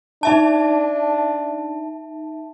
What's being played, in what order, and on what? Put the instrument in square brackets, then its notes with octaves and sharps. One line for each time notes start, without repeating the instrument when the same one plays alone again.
[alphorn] D4 [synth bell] D#4 E5 A5